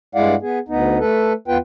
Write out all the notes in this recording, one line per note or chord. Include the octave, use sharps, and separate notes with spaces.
G2 G#3 E4 D5 F5 F#5
B3 G#4
D2 B3 D#4
A3 A4 B4
E2 B3 F4 B4 G5